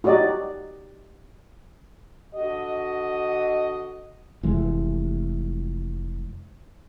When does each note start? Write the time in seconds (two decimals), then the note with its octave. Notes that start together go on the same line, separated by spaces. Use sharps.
0.04 D#4 F#4 G4 D5 D#5
2.35 D3 F#4 D#5
4.43 F1 E3 G#3